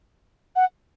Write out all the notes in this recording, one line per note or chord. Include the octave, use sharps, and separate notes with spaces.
F#5